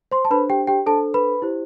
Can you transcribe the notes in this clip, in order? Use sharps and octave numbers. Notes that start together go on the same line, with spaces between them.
C5 C6
A5
D4 A4 B4 C5 B5
G4 G5
G4 G5
D4 A4 C5 A5
B4 B5
E4 G4 C5